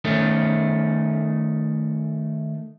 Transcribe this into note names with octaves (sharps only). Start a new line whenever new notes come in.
D#3 A3 C#4